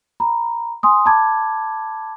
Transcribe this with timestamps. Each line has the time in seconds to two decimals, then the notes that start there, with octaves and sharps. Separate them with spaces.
0.20 A#5 B5
0.83 G#5 C6 D#6
1.06 A5 B5 D6 G#6